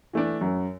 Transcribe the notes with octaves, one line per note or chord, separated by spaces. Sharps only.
E3 A3 D4
F#2